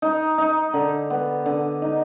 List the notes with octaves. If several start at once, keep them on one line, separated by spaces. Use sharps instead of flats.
D#4
D#4
D3
B3
D3
D#4